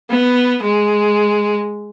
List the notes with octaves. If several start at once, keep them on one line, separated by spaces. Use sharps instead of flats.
B3
G#3